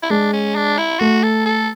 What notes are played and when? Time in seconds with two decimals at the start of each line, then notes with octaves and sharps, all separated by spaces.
0.02 E4
0.10 G#3 D4
0.33 C#4
0.55 D4
0.78 E4
0.99 A3 F#4
1.23 A4
1.45 A4